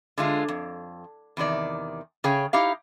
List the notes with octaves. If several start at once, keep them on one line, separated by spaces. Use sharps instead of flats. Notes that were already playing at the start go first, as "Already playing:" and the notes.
D3 G#3 F4
F2
E2 C3 D#3 D5
C#3 G#4 C#5 G5
D#4 E4 G4 F5